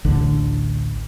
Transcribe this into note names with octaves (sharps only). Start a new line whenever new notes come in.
A1 D2 D3